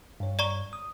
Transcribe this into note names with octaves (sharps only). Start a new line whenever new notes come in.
G2 C#5
D5 A#5 C#6
D#6